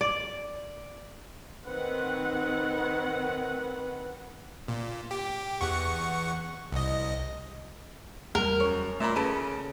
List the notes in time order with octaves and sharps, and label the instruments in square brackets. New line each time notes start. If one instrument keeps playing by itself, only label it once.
[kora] D5
[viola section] D#3 C4 F#5 [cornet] B4
[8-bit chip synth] A#2
G4
E2 F#5 C#6
C2 D#5
[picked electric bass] E2 G3 [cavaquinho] A#4
[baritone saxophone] F#2 [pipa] C#5
[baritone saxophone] A#2 [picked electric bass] A3 [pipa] E5 B5
[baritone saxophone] C#3 [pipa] A4 B4